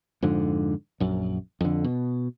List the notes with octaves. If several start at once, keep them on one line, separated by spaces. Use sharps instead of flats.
F2 G#2 D3
A#1 F#2
F2 D3
B2